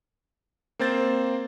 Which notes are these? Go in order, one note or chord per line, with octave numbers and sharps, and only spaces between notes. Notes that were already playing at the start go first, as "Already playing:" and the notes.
A#3 C4 C5 A6